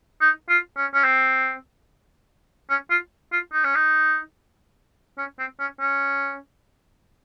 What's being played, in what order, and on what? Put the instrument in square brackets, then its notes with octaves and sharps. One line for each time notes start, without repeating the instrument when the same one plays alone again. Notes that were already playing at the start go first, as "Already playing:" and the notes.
[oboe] D#4
F4
C#4
C#4
C4
C#4
F4
F4
D#4
C#4
D#4
C#4
C4
C#4
C#4